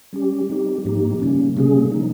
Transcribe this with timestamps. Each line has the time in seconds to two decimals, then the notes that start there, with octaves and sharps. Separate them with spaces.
0.13 G3 C#4 G4
0.49 G3 C4 D#4 G4
0.85 G#2 F3 A#3 D#4 G4
1.20 C#3 G3 A#3 C#4
1.57 C3 G3 A#3 C#4 G#4
1.92 F3 A#3 D#4